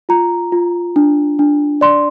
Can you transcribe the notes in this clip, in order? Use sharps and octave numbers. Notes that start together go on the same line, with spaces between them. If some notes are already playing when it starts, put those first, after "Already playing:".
F4 A#5
F4
D4
D4
D5 C6